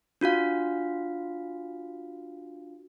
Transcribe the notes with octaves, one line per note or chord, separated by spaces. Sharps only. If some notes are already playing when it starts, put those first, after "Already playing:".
D4 F4 F#4 F5